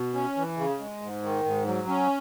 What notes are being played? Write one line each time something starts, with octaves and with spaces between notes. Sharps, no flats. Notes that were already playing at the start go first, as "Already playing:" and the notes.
Already playing: B2
C#4
E3
C#3
G#3
G#2
D#3
G#2
F#3
C#4